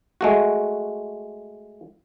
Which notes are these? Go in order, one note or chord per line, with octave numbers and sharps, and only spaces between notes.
G#3 A3 F#4